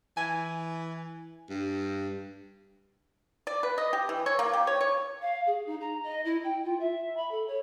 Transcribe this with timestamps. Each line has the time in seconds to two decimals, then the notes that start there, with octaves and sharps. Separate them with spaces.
0.17 E3 G#5
1.50 G2
3.47 D5
3.63 B4
3.78 D#5
3.93 G4
4.09 E3
4.26 C#5
4.39 A#3
4.54 G4
4.67 C#5
4.81 C#5
5.21 F5
5.46 G#4
5.66 D#4
5.80 A#5
6.03 D#5
6.25 E4
6.44 G5
6.63 F4
6.79 E5
7.16 B5
7.31 A4
7.47 C#5